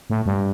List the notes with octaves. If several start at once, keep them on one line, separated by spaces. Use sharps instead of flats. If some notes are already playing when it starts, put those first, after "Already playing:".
A2
G2